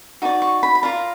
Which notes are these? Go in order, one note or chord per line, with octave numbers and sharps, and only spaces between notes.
D#4 F#4 D5
C#6
B5
B5
F4 A#4 D5 A#5